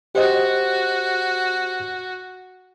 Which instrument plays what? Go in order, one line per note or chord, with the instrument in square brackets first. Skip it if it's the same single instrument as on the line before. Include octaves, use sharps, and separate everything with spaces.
[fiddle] F#4 [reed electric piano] G4 C5 D#5